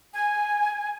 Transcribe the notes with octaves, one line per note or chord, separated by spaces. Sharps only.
G#5